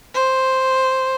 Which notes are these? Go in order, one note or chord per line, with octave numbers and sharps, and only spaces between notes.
C5